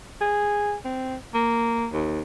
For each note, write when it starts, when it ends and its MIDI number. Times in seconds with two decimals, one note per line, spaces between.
0.21 0.76 68
0.85 1.16 60
1.34 1.87 58
1.93 2.21 39